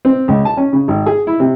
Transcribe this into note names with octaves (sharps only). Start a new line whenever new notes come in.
C4
C#2
A5
C#4
C#3
G#1
G#4
E4
C3